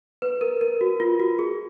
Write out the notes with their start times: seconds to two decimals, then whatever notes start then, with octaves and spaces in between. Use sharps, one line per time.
0.22 B4
0.41 A#4
0.61 A#4
0.81 F#4
1.00 F4
1.20 F#4
1.39 G#4